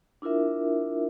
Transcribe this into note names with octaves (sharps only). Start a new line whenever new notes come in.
D4 E4 F4 A#4 E5